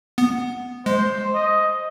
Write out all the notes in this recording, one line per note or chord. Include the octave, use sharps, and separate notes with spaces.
B3
G#3 C5
D#5